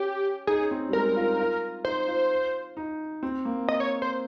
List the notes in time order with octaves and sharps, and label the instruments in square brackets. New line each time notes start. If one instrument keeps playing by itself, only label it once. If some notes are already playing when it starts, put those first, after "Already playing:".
Already playing: [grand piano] C#4 [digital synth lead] G4
[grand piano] D#4 [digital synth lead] G#4
[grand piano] C#4
C4
G3
[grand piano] G#3 [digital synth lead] A#4
[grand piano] G3
F4
D#4
F4
[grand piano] D#4 [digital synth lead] C5
[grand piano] F4
D#4
C4
A#3
[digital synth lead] D#5
C#5
C5